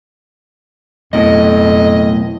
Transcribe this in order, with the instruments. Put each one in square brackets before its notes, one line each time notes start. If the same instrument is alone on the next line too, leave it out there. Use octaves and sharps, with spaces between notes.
[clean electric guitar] B1 A2 [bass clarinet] F2 [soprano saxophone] D#5